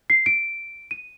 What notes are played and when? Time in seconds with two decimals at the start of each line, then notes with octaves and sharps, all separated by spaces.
0.10 C7
0.26 D7
0.91 D#7